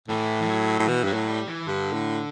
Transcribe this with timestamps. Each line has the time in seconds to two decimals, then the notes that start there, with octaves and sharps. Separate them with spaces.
0.08 A2 E3
0.42 E3
0.48 F#3
0.79 A2
0.88 B2 E3
1.04 G2 F#3
1.14 A2
1.28 G3
1.47 E3
1.67 G2 D3
1.93 A2